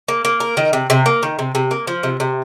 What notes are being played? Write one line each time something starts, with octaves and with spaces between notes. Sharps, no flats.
A#3
A#3
A#4
D#3
C3
C3
A#3
D#3
C3
C3
A#3
F3
C3
C3